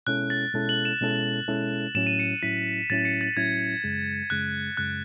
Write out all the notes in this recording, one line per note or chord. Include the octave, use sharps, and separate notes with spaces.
B2 G#3 C#4 E4 A4 F#6
A6
B2 G#3 C#4 E4 A4
F#7
E7
B2 G#3 C#4 E4 A4
B2 G#3 C#4 E4 A4
A2 F#3 C#4 E4 E7
D#7
C#7
A2 F#3 C#4 E4 B6
A2 F#3 C#4 E4 A6
C#7
A6
A2 F#3 C#4 E4 G#6
F#2 C#3 G#3
F#2 C#3 G#3 F#6
F#2 C#3 G#3 F#6